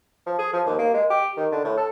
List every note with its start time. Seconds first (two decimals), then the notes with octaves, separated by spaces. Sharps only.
0.26 F3
0.39 G#4
0.53 F3
0.67 D#2
0.79 A#3
0.94 G#3
1.11 G4
1.37 D#3
1.52 D3
1.65 A2
1.77 A4